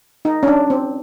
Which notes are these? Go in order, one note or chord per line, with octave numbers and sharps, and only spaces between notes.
D#4
C#4
D4
C4